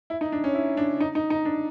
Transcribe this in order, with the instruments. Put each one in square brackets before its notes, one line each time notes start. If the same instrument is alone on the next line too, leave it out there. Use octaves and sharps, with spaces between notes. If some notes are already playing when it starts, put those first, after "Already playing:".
[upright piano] E4
D#4
D4
C#4
E4
D4
D#4
D#4
D#4
D4